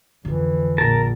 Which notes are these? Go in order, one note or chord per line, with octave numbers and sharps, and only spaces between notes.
F2 D3 E3
A#1 A#4 A5